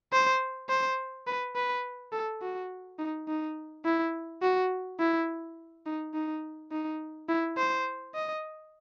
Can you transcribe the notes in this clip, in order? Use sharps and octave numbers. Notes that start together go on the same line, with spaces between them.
C5
C5
B4
B4
A4
F#4
D#4
D#4
E4
F#4
E4
D#4
D#4
D#4
E4
C5
D#5